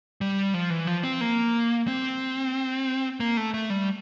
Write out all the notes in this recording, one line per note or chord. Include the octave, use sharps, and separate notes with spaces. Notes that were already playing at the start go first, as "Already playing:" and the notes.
G3
F3
E3
F3
C4
A#3
C4
A#3
A3
A3
G3